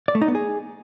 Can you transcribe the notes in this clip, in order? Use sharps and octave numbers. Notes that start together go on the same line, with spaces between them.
D5
A3
D#4
B3
G#4